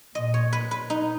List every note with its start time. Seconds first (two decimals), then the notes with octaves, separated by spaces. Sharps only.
0.15 A#2 D#5
0.34 C#5
0.53 B4
0.71 B4
0.90 D#4